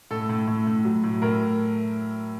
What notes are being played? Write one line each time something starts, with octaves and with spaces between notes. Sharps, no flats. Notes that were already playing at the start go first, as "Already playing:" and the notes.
A2 A4
A2
A2
A2
F#3
A2
A2 A#4